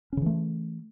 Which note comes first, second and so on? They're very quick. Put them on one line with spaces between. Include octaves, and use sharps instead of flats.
C#4 C#3 E3 A3